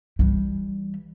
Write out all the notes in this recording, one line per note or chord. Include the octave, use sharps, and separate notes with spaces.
E3 G3